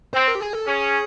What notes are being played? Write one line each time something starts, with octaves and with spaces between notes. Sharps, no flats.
C4 C5
A#4
G4
G#4
A4
C#4 G#4